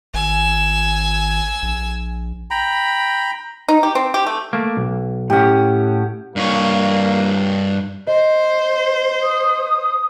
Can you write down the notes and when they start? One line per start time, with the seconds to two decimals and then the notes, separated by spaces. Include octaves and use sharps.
0.14 G#1 G#5 E6
1.63 A#1
2.51 G5 A#5 B5
3.68 D#4
3.83 G4
3.95 C4
4.14 G4
4.26 A3
4.53 A3 A#3
4.77 B1
5.30 A2 C#4 G4 F#5
6.36 G2 A#3 C#5
8.07 C5 D#5
9.22 D#6